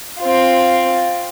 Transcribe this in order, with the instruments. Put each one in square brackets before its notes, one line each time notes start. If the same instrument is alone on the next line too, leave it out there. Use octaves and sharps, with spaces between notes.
[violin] C4 F4